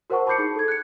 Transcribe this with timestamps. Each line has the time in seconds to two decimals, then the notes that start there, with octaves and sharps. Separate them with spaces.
0.10 F#4 A#4 C5 F#5 A5 C#6
0.27 A5 B5 D6 G6 C7 C#7
0.38 D#4 G#4 C#7
0.56 A4 G#6
0.68 F#6 C#7